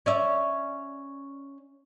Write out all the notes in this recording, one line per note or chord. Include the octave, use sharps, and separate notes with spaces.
C#4 D5 E5